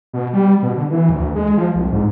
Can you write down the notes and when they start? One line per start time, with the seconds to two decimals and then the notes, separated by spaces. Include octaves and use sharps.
0.13 B2
0.33 G3
0.62 B2
0.76 D3
0.91 E3
1.09 D2
1.35 G#3
1.57 F3
1.75 C2
1.92 G#2